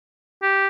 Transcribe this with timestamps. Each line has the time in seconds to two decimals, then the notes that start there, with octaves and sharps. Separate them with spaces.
0.42 G4